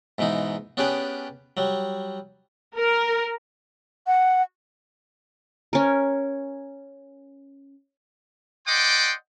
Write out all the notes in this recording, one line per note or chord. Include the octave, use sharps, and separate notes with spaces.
G#2 B2 E3 D#4
B3 C#4 D4 G4 G#4 B4
F#3 G3
A#4
F#5
C#4 A#4
D5 D#5 F#5 G5 C6 D6